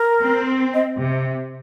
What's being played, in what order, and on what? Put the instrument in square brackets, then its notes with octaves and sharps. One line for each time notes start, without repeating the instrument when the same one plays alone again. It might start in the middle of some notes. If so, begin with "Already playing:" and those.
Already playing: [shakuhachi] A#4
[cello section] C4
[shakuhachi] D#5
[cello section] C3